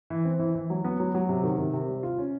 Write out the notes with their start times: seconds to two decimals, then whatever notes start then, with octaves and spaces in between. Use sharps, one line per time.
0.10 E3
0.25 C4
0.39 E3
0.55 E3
0.70 F#3
0.84 B3
1.00 F#3
1.15 F#3
1.29 C3
1.44 D#3
1.59 C3
1.73 C3
1.88 G3
2.03 F4
2.18 C#4